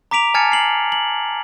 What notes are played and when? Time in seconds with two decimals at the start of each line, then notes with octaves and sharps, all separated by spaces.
0.11 A#5 D6 B6 D7 F7
0.34 G#5 A5 F6 G#6 A6 C#7
0.52 C7 F#7
0.92 F#7